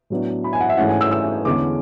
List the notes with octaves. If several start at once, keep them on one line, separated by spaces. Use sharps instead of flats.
A2 F#3 B3 D4
B5
G#5
F#5
E5
G#2 E3 A3 C#4 F#5
G#5
E6
E6
E2 D3 G#3 C#4 D6